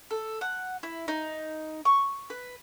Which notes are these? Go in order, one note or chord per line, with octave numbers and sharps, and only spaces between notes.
A4
F#5
E4
D#4
C#6
B4